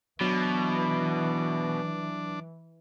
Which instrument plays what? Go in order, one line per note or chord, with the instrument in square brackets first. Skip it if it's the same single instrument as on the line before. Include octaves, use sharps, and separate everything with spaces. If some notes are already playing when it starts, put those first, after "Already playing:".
[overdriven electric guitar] B2 [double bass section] E3 [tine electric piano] F#3 [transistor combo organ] D4